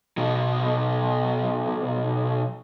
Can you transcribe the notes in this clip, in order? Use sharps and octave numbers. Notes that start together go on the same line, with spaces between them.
B1 B2